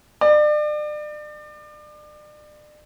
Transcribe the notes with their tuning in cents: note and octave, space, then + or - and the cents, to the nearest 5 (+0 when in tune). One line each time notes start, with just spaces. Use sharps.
D5 +35